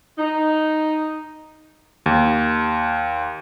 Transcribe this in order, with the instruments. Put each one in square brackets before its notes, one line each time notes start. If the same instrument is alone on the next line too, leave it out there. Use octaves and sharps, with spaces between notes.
[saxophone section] D#4
[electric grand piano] D#2